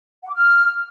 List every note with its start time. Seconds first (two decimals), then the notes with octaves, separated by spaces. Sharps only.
0.23 F#5
0.29 D6
0.34 F6